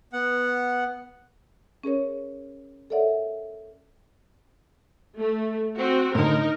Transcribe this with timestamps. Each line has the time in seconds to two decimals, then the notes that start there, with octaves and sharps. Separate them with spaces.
0.13 B3 F#5
1.84 C#4 G#4 A#4 C#5
2.90 A4 A#4 C#5 D5 E5 F#5
5.17 A3
5.77 C4 F#4
6.15 A2 D3 D#4 A#4